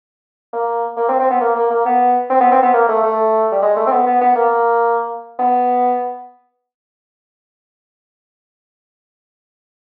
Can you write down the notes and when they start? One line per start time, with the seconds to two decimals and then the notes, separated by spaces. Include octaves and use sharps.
0.53 A#3
0.97 A#3
1.09 C4
1.19 C4
1.30 B3
1.41 A#3
1.56 A#3
1.71 A#3
1.86 B3
2.30 C4
2.41 B3
2.52 C4
2.63 B3
2.74 A#3
2.89 A3
3.03 A3
3.52 G3
3.62 G#3
3.77 A3
3.87 C4
3.91 B3
4.07 B3
4.21 B3
4.35 A#3
5.39 B3